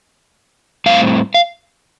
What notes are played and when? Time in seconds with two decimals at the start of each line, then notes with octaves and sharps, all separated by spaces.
0.86 A2 G3 C4 F5
1.34 F5